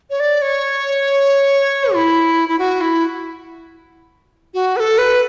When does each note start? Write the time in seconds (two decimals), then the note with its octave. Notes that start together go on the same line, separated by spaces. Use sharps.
0.10 C#5
0.20 D5
0.42 C#5
1.94 E4
2.49 E4
2.59 F#4
2.81 E4
4.54 F#4
4.76 B4
4.80 A4
4.98 B4